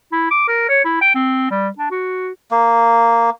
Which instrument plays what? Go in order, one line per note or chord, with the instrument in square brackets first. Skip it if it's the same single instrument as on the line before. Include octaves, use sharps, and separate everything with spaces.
[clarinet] E4
D6
A#4
C#5
E4
G5
C4
G3
D4
F#4
[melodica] A#3